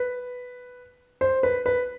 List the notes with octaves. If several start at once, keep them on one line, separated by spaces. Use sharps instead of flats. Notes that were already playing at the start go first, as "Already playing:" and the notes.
Already playing: B4
C5
B4
B4